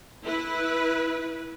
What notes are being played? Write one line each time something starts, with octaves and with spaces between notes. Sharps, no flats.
E4 B4